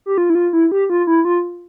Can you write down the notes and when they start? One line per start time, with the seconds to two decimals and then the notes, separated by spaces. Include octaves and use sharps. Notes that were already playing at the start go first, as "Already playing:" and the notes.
0.06 G4
0.18 F4
0.30 E4
0.35 F4
0.53 E4
0.72 G4
0.90 F4
1.07 E4
1.25 F4